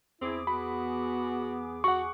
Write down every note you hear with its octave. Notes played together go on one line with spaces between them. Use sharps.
E2 C4 E4 G#4 D6
B3 F#4 B5
F#4 F#5 C#6